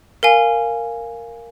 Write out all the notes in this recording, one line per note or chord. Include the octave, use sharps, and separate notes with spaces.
A#4 F5 G#5